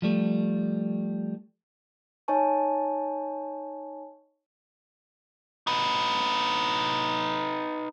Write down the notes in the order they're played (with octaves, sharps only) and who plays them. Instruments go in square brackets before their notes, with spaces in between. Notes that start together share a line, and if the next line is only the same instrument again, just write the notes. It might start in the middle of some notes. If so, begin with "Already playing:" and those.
[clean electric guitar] F3 G3 A3
[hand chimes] D#4 C#5 D#5 G#5 A5 C#6
[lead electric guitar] D#4 B4